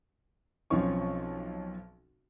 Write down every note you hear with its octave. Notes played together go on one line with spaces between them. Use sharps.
B1 F3 C4 C#4 C#6